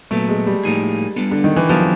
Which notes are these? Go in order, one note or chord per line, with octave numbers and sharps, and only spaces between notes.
A#2 F#3 A3 B3
G#3
G3
A2 F3 A#3 D#4 G#4
G3 B3 D4 F4 A4
D3
D#3
E3
F3 F#3 B3 D4 G4 C5